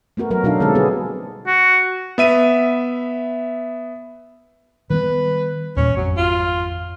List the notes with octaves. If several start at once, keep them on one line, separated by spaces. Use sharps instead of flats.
A3 B3 F#4 A#4
F#3 F#4 A#4
B2 F#3 D4 D#4 A4 F5
D3 G#3 B3 C4 A4
G3 B3 F#4 G#4
F#4
B3 E5 D#7
D#3 G3 B3 B4
D#2 A#2 G3 C#4
G#1 F2 F#3
F4